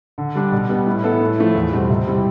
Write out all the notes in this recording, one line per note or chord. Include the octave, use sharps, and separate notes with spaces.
D3
G3 D4
B2
G3 B3
A2
E3 B3 E4 A4
A2
F3 A3 E4
E2
B2 G3 C4
C3
G3 C4 E4